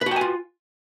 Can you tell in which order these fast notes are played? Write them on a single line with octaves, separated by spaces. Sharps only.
B4 F#4 G5 G#5 F4